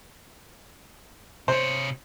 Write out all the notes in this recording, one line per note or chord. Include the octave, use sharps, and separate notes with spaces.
C3 C5 C#5